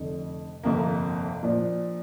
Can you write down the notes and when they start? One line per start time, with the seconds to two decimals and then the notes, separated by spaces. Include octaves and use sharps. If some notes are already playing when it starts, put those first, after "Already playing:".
Already playing: F1 F2 D3
0.63 G1 F2 C3 A#3
1.43 A#2 F3 D4